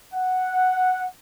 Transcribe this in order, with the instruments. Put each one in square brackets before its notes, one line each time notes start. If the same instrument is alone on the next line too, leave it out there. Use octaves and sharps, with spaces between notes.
[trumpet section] F#5